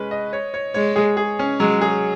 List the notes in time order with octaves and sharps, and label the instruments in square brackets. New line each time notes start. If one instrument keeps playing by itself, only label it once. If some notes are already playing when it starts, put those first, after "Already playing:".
Already playing: [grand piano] G#3 C#4 B4
D#5
C#5
C#5
[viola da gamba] G#3 [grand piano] C#5
[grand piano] G#4
G#4
C#4
[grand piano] F#3 [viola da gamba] G#3
[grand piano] G#4